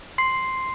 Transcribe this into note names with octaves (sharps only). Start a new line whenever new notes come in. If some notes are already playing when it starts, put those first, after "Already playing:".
C6 C7